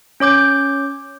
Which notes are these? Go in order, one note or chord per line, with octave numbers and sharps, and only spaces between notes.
C#4 C#5 D6 G6